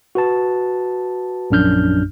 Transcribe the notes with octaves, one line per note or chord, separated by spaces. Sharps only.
F#4 B4 A5
A#1 F#2 D4 F6 G6